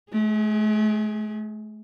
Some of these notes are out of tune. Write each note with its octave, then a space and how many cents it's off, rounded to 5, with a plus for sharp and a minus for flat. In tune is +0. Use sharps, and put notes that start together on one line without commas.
A3 -45 G#4 +0